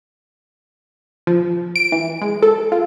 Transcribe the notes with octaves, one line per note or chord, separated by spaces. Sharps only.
F3
D7
E3
G#3
A4
F4